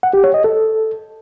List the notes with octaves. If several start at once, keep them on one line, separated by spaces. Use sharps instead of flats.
F#5
G4
C#5
D#5
A4